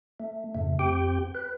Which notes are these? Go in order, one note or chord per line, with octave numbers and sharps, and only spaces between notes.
A3
F2 G#2 C#3 A3
F2 C4 G4 G5
B4